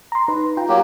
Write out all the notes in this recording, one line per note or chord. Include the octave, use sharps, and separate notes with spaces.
A#5 C6
D#4 B4
F4 G5 A#5
F#3 A#3 G4